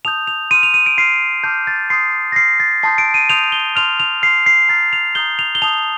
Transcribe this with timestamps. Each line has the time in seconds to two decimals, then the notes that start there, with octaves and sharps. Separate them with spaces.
0.05 A5 D#6 G6 F7
0.27 F7
0.51 C6 F6 D#7
0.63 F7
0.74 D#7
0.86 D7
0.98 C6 F6 C7
1.43 A5 D6 F6 G6
1.67 A6
1.90 C6 D#6 G6 C7
2.32 A#6
2.36 C6 F6 C7
2.60 A6
2.83 A5 C6 D#6 G6 C7
2.98 D7
3.14 D#7
3.29 C6 D#6 G6 F7
3.52 G7
3.76 A5 C6 F6 F7
4.00 F7
4.22 C6 F6 C7
4.46 C7
4.69 A#5 F6 A6
4.93 F7
5.15 A#5 D#6 G6 G7
5.39 F7
5.55 G7
5.62 A5 D#6 G6 F7